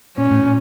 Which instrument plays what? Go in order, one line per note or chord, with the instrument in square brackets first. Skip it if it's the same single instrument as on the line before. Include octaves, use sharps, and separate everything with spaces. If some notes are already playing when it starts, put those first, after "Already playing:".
[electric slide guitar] A#2 [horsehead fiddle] C#4
[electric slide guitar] A2
A#2